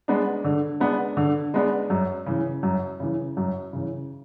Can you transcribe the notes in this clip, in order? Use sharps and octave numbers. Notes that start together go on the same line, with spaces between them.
G#3 B3 D4
D3
G#3 B3 D4
D3
G#3 B3 D4
F#2
C#3 E3
F#2
C#3 E3
F#2
C#3 E3